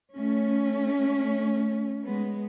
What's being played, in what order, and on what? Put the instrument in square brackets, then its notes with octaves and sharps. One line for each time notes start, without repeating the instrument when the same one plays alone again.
[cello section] A3 C#4
G#3 B3